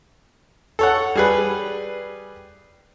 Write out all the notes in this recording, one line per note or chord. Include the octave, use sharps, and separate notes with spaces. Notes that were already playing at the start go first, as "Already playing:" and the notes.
A4 C#5 F#5
G3 G#4 B4